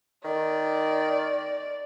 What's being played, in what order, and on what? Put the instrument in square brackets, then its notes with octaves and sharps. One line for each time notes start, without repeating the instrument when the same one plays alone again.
[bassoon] D#3 [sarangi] D5